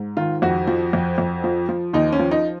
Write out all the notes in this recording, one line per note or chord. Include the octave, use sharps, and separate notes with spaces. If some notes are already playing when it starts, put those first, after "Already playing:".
Already playing: G#2
D#3 F4
F2 F#4
F3
F2
F2
F3
F3
D#2 D#4
C#4
F3
D#4